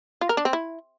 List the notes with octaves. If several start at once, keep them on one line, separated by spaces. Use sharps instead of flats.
F4
A#4
D4
C4
E4